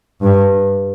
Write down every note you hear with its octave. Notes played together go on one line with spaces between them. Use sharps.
G2